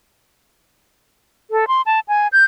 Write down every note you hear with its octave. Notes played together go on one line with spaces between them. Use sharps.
A4
C6
A5
G#5
G6